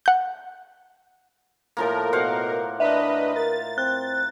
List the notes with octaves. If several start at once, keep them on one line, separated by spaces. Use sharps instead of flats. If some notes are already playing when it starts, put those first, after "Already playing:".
F#5 G6
A2 F3 A#3 A#4
B2 C5 F5 F#5
D4 B4 D#5 E5
A#4 A6
C4 F#6